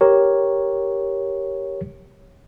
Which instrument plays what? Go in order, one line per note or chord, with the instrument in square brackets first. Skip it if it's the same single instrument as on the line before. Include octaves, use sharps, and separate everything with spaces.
[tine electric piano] G4 A#4 C#5